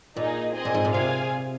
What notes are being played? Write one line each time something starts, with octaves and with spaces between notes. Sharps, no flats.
A#2 A#3 D#4 G#4
C4 G#4 C5 D#5 G#5
A#2
G#2
A#2
C3 C4 F4 G#4 F5 G#5